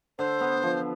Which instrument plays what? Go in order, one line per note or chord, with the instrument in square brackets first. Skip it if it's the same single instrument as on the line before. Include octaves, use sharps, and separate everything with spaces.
[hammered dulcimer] D3 [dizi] C5
[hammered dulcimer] B3
F3